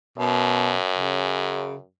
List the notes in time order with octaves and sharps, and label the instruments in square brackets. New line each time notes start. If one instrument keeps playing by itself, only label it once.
[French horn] F#2 [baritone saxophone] B2
[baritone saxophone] C#3